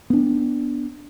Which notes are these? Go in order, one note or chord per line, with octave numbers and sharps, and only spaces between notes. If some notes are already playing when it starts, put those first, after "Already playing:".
B3 D4